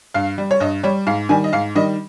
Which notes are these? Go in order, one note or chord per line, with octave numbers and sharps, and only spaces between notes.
G2 F5
G3
C#5
G2 D#5
G3 C#5
G#2 F5
D#3 G3 G#5
D#5
G#2 F5
D#3 G3 D#5